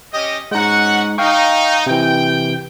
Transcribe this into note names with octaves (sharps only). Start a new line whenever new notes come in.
C#4 G4 D#5
G#3 C#4 D#4 F#4 F#5
D#4 F5 G5 C#6
C3 E3 G5